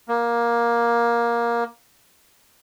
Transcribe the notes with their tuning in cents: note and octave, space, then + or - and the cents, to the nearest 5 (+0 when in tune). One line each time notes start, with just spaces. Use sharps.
A#3 +15